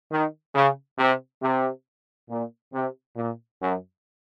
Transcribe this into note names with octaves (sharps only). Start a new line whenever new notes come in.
D#3
C#3
C3
C3
A#2
C3
A#2
F#2